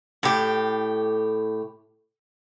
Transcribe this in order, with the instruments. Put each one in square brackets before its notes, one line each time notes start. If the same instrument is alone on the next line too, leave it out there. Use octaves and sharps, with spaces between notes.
[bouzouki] A2 G4